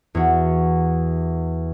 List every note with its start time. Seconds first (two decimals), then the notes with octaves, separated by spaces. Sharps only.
0.15 E2 F#4